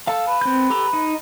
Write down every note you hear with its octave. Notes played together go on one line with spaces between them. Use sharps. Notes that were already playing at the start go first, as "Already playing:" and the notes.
A4 F5 A5
B4
C4 G6
G4 A4 A#5
D#4